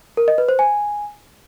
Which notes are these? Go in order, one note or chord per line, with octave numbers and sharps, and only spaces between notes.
A#4
D#5
B4
C5
G#5